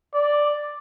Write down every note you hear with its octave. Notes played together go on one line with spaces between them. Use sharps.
D5